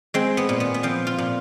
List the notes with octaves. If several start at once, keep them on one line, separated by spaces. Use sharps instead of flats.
G#3 C4
B3
A#2
B3
B3
F3 C4
F4
A#2